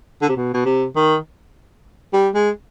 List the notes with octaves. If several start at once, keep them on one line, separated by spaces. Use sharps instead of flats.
D3
C3
B2
B2
C3
D#3
G3
G#3